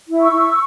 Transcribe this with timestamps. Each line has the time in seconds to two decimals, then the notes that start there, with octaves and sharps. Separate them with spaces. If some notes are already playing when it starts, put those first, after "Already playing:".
0.08 E4
0.20 C#6 E6
0.31 E4